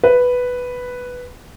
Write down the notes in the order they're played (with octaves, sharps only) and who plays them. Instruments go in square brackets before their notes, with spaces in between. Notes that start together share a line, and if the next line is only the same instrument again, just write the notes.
[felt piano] B4